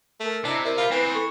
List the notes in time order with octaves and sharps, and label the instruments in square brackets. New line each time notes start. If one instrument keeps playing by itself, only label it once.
[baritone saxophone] A3 [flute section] A4 A#4
[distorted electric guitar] C3 [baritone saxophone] D4 [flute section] E4 D#5 A#5
[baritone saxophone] E4 [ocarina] A#4 [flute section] D5
[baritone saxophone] F4 [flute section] B5
[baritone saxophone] E3 [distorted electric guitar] B3 C4 [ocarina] B4
[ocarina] A4 [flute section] C#6